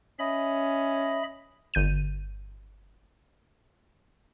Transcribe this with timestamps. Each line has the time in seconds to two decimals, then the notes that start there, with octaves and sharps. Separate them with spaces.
0.19 C#4 D#5 E5 B5
1.74 G1 G6 D#7